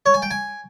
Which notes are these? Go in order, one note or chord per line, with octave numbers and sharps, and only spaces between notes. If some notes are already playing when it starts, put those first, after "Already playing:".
C#5
G#5
G5
G#5